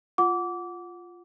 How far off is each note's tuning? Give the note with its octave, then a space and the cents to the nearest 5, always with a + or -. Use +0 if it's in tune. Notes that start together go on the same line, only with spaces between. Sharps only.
F4 +0 F#5 -5 D6 -25